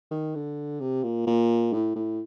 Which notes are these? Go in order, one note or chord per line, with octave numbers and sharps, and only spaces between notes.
D#3
D3
C3
A#2
A#2
A2
A2